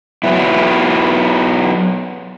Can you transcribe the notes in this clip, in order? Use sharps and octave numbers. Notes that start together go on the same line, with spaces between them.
F#3 B3 E4